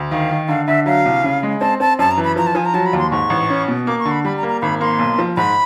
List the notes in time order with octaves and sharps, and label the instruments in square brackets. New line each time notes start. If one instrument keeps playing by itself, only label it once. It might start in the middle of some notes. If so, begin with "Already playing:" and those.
Already playing: [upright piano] D2
[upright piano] D#3 [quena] F5
[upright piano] D#3
[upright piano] D3 [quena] F5
[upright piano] D3 [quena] E5
[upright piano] F#3 [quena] F5
[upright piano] C2
C#3
G#3
[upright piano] C4 [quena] A5
[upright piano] C4 [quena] A5
[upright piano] F#2 [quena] A5
[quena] A#5
[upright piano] E3
[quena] B5
[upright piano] F3 [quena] A#5
[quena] A5
[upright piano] F3 [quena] G#5
[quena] A#5
[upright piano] F#3 [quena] A5
[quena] B5
[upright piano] D#2
[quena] C6
[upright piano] G#2 [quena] C#6
[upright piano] A1
C#4
B2
[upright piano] A#3 [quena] D6
[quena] C#6
[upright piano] D3
[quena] B5
[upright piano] G3 [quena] B5
[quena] A#5
[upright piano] A#3
[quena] A#5
[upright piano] G#1 [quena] B5
[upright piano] A#3 [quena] C6
[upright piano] B1
F3
[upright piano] G#2 [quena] B5